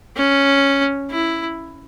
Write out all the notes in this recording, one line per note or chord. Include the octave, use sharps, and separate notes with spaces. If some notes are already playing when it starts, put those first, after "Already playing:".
C#4
E4